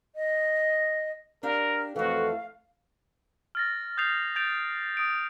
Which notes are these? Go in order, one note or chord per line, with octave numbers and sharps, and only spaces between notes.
D#5
D4 G4 A#4 F5
F2 E3 A3 F#4 A4 F5
F6 A6 A#6
D#6 G6 A6 C7 F7
G6 A6 D7 F7
D#6 D7